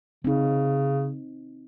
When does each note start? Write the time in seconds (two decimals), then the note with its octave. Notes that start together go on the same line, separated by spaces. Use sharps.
0.24 C#3 C4 D#4